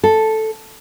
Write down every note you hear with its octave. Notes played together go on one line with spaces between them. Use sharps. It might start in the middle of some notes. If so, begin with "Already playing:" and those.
A4